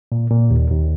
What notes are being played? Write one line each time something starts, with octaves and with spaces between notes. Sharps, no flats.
A#2
A#2
D#2
D#2